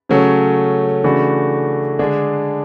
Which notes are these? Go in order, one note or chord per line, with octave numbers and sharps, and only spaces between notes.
C#3 F#3 A3 C#4
C#3 E3 A3 D4 F#4
D3 G#3 D4 G#4